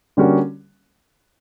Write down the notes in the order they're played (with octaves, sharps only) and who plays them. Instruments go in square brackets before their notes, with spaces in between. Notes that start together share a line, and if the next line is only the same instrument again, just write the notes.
[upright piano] D3 G3 A#3 C#4 F#4